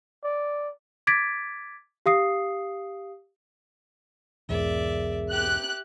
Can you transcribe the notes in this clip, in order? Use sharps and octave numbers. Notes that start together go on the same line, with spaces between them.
D5
D6 G#6 A6 B6 D7
G4 F5 D#6 C7
B1 E2 G#2 B3 G#4 A#4 D5 E5
G4 F#6